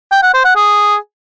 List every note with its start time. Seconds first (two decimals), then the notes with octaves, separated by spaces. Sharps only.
0.12 G5
0.23 F#5
0.34 C5
0.45 F#5
0.56 G#4